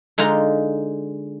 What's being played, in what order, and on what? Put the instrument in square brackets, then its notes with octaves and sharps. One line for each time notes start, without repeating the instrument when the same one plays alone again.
[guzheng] D3 G#3 D#4 F4 A#5